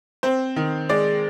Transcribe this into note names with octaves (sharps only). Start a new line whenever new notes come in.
C4 C5
D#3
G#3 D5